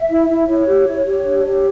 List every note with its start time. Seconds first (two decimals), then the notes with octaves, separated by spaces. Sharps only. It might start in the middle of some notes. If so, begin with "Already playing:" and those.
Already playing: E5
0.09 E4
0.28 E4
0.47 E4 C#5
0.67 G4
0.86 E4
1.05 G4
1.24 D4
1.44 G4